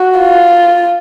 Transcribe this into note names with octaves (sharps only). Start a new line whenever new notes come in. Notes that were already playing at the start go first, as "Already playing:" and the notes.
Already playing: F#4
F4